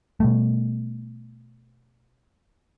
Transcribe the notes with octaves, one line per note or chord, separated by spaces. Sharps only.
B2 G3 A3